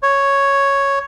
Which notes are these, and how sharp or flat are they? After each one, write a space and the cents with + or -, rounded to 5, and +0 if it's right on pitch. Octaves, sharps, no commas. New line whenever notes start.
C#5 +0